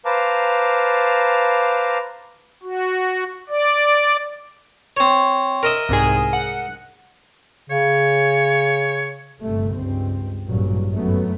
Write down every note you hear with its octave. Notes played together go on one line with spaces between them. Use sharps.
B4 C5 F5 A5 A#5 D6
F#4
D5
C4 C#5
A#4 D#5 E5
C2 G#2 G#4
F#5
C#3 C#5
G1 C3 A3
C#2 G2 C4
A1 G2 A#2 C#3 F#3
G#1 F#2 F#3 A3 B3